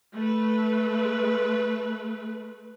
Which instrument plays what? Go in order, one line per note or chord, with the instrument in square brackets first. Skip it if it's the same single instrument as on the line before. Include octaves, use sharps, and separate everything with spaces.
[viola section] A3 B4